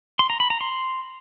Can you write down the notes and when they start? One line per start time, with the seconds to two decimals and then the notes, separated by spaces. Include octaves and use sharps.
0.19 C6
0.30 A#5
0.40 B5
0.50 A#5
0.61 C6